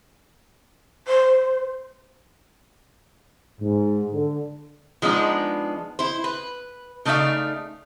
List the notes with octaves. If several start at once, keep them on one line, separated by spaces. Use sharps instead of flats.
C5
G#2
D3
F3 G#3 B3 D4 D#4
E4 C5
B4
C#3 A3 D#4 D5 E5 F5